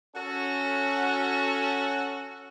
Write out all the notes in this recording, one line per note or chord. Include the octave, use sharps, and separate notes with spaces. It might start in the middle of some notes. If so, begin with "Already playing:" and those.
C#4 F#4 A4